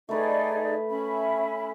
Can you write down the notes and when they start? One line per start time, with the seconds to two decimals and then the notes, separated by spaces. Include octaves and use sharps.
0.09 A3 D#4 G#4 B4 D5
0.90 C#4 E5 B5